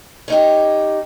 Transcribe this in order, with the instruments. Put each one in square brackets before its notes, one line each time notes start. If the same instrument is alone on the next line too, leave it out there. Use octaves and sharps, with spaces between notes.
[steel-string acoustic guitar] C#4 D#4 G4